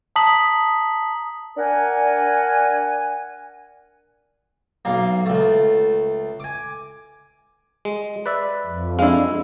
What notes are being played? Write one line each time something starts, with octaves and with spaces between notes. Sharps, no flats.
A5 A#5 D#6 B6 F#7
D4 A#4 F#5 G#5
B1 A#3
C#2 A3
G#5 D6
G#3
B4 D5 E5
F2
G#3 D4 E4 F5